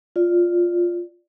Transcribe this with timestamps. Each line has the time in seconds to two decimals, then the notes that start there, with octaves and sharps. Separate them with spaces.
0.16 F4 D5